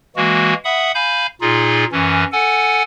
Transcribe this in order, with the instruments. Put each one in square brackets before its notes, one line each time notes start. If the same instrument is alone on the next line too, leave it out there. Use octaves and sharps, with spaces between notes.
[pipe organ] E3 G#3 A#3 F#4
E5 F#5 B5 D#6
F5 G#5 B5 G6
A#2 D#4 F4 G#4
F#2 E3 C#4
A4 F#5 G#5